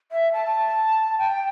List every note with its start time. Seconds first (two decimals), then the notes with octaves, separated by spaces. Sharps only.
0.12 E5
0.32 A5
1.18 G5